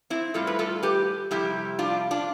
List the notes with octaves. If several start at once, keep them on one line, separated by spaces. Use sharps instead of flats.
C4 E4
A2 G3 F4 A4
B4
F4 A4
G4 B4
F2 C3 G3 E4 G4
D4 F4
D4 F4